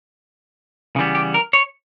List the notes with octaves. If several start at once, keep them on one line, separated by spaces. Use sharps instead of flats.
C#3 E3 G3 B3
G4
A#4
C#5